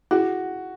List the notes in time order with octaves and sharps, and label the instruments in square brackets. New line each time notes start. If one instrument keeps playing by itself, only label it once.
[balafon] E4 G#4 [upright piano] F#4